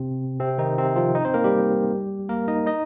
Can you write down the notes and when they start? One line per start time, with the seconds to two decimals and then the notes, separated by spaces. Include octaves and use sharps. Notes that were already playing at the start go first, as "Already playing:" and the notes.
Already playing: C3 C4
0.39 C3 C4
0.58 D#3 D#4
0.78 C3 C4
0.96 F3 F4
1.15 D#4 D#5
1.25 C4 C5
1.34 A#3 A#4
1.44 G3 G4
2.29 A#3 A#4
2.48 D#4 D#5
2.66 D#4 D#5